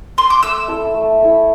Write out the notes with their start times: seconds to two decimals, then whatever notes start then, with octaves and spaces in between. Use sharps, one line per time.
0.18 C6
0.30 D6
0.43 A3 E6
0.68 E4 A4 E5
0.94 A3
1.20 E4 A4 E5